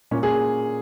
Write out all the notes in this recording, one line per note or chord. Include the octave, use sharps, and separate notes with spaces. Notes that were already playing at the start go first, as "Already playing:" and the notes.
A#2 C#4
G#4